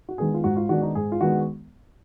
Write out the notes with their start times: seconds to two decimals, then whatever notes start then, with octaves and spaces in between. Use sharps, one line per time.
0.09 F#4
0.18 D#3 G#3 B3 D4 G#4
0.34 F4
0.44 G#2 F#4
0.57 F4
0.69 D#3 G#3 B3 D4 F#4
0.82 D#4
0.95 G#2 G#4
1.12 F4
1.21 D#3 G#3 B3 D4 F#4